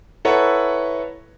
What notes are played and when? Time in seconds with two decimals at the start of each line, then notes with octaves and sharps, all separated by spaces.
0.25 E4 A4 B4 C#5 F#5 A#5